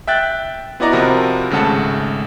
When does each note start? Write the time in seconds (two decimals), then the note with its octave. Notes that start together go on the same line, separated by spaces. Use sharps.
0.07 E5 G5 F#6 A6
0.80 B3 E4 F#4 D5 D#5 A#5
0.92 C3 F3 F#4 A#4 B5
1.50 G#1 C#3 G#3 A3 F#5 A5